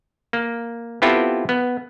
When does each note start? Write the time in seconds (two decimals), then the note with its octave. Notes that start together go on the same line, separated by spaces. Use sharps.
0.33 A#3
1.02 B3 C4 E4 F4 G4 A4
1.49 B3